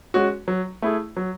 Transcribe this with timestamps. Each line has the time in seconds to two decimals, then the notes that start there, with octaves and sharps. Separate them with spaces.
0.14 G#3 C#4 F#4
0.48 F#3
0.82 A3 E4 G#4
1.17 F#3